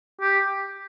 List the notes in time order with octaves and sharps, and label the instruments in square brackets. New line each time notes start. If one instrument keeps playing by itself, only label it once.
[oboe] G4